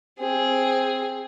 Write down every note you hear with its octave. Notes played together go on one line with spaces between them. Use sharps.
C4 G#4